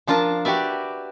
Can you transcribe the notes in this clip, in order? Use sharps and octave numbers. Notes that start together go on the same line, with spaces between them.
F3 D4 F4 A#4 A5
F#4 G4 B4 D5 E5